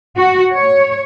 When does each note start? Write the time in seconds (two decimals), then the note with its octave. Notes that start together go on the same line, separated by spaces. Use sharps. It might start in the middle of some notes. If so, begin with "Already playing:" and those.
0.17 F#4
0.53 C#5